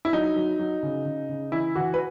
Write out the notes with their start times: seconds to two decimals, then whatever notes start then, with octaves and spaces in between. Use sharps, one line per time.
0.05 E4
0.13 F#3 D#4
0.36 F#3
0.59 F#3
0.83 C#3
1.05 C#3
1.29 C#3
1.52 E3 E4
1.75 E3 F#4
1.94 B4